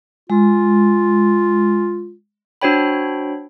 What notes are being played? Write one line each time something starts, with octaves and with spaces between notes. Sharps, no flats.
G#3 F4
D4 F#4 C5 C#5 G5 B5